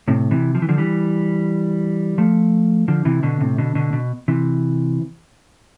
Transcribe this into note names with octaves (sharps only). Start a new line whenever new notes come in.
A2 C3
C3 E3
F3
E3
D3 F3
E3 G3
F3 A3
D3 F3
C3 E3
B2 D3
A2 C3
B2 D3
B2 D3
B2
C3 E3